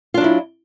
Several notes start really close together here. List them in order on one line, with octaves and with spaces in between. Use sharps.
F4 D4 F#3 E4